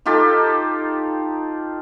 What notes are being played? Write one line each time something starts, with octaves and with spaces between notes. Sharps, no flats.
D#4 F4 G4 A4